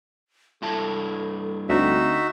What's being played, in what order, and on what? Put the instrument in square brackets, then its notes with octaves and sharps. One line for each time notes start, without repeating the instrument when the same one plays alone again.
[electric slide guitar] G2 E4 A5 [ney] A4
[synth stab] D2 [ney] C4 [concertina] D#4 F#4 E5